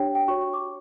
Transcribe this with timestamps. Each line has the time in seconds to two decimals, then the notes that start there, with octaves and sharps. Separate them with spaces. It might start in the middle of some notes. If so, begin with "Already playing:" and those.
Already playing: D4 G4 C#5 G5
0.15 G5
0.28 F#4 C#5 C#6
0.41 C#6
0.53 D6